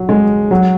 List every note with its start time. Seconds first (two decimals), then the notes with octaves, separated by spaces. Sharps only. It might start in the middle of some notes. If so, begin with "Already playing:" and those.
Already playing: F#3
0.09 G#3
0.51 F#3